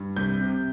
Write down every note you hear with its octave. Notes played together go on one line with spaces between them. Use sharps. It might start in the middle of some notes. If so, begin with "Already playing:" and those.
Already playing: G2
C2 G6
C3